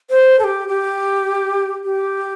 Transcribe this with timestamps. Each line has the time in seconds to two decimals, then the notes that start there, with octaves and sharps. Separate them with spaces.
0.10 C5
0.39 A4
0.44 G4
0.68 G4
1.84 G4